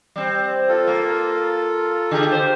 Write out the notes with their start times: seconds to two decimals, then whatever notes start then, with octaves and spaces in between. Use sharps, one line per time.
0.16 G3 C4
0.69 F4 A4
0.87 A#3
2.11 D3 G4 G#4
2.28 G4 C5